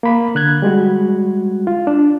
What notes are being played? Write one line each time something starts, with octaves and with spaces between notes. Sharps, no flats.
A#3 B5
D3 F#6 G#6
G3 G#3 F#4
F4
D4